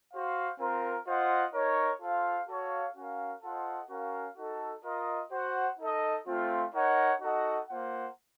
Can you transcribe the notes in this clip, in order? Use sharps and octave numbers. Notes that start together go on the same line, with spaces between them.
F#4 C5 F5
C4 F4 A#4
F4 C5 D#5 F#5
D#4 A#4 C#5
F4 A4 C5 F5
F#4 A4 C#5 F5
C#4 F#4 A#4 F5
F4 A4 C5 D#5 F#5
C#4 F#4 A#4 F5
D#4 F#4 A4
F4 A#4 D#5
F#4 C5 F#5
D#4 A4 D#5
A3 C4 F4
D#4 A#4 C#5 F#5
D#4 F#4 A4 D#5 F#5
A#3 F4 C5 F#5